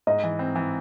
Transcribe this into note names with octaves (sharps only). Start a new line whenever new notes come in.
G#2 D#5
E3
C4
E3